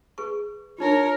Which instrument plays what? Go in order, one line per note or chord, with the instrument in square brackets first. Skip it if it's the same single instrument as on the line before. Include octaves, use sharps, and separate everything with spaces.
[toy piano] G#4 B4 C#6
[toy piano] D4 D#4 F4 [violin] A#4 C#5